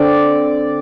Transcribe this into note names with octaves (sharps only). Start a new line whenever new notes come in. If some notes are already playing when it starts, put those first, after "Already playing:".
Already playing: D3 C4 D5